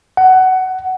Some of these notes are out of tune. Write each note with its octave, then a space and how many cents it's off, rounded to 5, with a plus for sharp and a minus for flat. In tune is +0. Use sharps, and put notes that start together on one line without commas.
F#5 +15